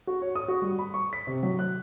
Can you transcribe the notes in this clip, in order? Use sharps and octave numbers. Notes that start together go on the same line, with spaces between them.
F#4
C#5
D#6
F#4
G3
B5
C#6
B6
C3
F#3
F#6